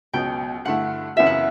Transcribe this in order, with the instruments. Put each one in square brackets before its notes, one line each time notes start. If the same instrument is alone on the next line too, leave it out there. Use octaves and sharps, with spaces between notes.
[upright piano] C#2 B2 F#3 B3 [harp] G5
[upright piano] G2 D3 A3 E4 [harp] F#5
[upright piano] F#2 C#3 E3 B3 F#4 [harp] E5
[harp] F#5